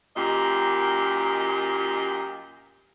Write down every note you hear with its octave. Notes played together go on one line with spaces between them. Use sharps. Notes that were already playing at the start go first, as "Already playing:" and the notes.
F#2 A#2 G4 D#5